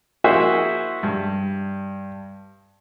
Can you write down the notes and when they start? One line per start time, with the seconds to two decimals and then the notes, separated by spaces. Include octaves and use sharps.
0.24 A#3 E4 F#4 G#4 C5 E5
1.03 G2